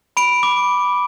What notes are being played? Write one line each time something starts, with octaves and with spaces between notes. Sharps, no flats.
B5 D7
D6